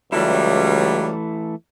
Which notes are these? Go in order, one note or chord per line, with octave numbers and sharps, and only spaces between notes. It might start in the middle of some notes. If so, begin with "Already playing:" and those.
C#2 E3 F#3 G3 A3 E4